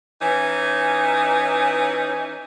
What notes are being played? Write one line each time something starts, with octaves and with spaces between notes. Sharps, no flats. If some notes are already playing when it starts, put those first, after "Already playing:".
E3 C#4 D#4